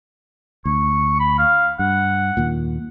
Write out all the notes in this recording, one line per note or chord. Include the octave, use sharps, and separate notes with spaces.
D2 C#6
B5
F5
G2 F#5
D#2 A#2